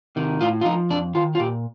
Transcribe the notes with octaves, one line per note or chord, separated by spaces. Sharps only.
C3 D#3
A2 F4
F4
F3 D#4
F2 D4
D#3 F4
F4
A#2 G4